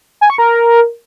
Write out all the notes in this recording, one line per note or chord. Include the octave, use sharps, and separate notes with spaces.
G#5
C#6
A#4